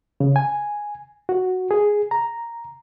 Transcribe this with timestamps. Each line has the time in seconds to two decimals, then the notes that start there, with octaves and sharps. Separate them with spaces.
0.20 C#3
0.36 G#5
1.29 F#4
1.71 G#4
2.11 A#5